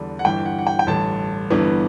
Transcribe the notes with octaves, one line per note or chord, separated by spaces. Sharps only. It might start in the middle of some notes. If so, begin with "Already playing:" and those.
Already playing: E2 D3 G3 D4
F#5
G1 G2 E3 G5
F#5
F#5
G5
G5
A1 G2 D3 A5
G1 G2 E3 B3